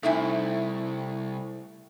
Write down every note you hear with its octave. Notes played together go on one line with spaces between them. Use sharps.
C2 A3 C4 D#4 E4 E5 G#5